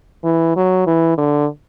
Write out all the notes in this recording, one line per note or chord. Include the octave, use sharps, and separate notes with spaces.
E3
F#3
E3
D3